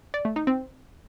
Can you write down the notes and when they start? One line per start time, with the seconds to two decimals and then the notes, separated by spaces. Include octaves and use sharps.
0.14 D5
0.25 A3
0.36 D#4
0.47 C4